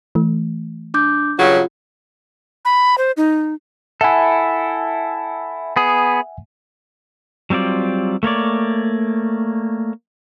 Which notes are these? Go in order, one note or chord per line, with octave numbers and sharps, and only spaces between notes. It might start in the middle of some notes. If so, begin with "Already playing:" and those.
E3 A3
D4 D6 G6
G2 C#3 F#3 F4
B5
C5
D#4
E4 A4 E5 F#5 G#5
B3 G#4
F#3 G3 C4 F4 D5
A3 A#3 C#5 D5